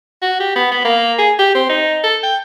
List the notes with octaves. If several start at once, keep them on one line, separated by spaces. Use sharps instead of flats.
F#4
G4
B3
B3
A#3
G#4
G4
C4
D#4
A4
G5